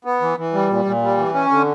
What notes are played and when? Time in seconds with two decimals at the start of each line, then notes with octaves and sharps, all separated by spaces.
0.05 B3
0.21 E3
0.38 E3
0.53 G3
0.69 A#2
0.85 A#2
1.02 G3
1.17 E3
1.34 C#4
1.51 D3